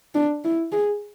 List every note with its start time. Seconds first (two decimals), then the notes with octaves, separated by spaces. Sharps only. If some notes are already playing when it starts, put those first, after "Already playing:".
0.15 D4
0.44 E4
0.72 G#4